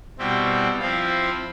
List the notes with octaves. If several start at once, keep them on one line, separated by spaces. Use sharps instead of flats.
B2 G3 C4 E4 G5
F3 C4 E4 F5